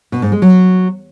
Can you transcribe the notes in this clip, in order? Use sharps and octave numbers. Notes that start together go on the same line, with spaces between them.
B2
G#2
G#3
F#3